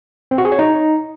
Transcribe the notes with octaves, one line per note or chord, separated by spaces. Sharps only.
C4
F#4
G#4
C#5
D#4